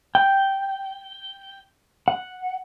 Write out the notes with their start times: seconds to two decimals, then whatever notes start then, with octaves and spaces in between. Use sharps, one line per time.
0.15 G5
2.08 F#5